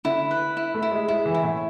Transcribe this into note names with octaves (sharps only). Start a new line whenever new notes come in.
D3 E4
B4
E4
A3
E4
G#3
G#3 E4
E3
E4
A2